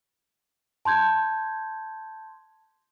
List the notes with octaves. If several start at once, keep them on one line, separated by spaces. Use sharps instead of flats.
A5 C6 G6 G#6